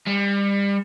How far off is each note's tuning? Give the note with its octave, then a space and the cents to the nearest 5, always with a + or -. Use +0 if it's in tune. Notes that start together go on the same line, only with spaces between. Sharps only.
G3 +30